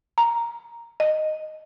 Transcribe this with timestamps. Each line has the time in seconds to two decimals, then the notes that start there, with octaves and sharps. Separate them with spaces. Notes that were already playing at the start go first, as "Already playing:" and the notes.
0.18 A#5
1.00 D#5